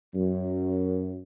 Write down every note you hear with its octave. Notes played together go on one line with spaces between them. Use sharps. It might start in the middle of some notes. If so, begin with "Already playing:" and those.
F#2